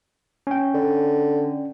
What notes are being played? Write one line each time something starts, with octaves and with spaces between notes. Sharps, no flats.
C#4 G5
D3